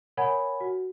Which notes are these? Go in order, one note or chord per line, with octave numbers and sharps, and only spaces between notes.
A#4 C#5 F#5 G#5 B5 G#6
F#4